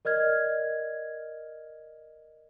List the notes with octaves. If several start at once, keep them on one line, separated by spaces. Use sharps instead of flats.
A#4 D5 D#5 F6 G#6